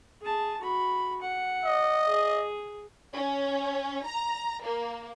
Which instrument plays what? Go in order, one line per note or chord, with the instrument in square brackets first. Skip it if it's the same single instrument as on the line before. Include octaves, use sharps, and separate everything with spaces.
[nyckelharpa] G#4 A5
F#4 B5
F#5
[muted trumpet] D#5
[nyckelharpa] G#4
[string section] C#4
A#5
A#3